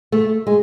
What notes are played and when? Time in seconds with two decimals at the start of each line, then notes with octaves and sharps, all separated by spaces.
0.12 A3
0.47 G#3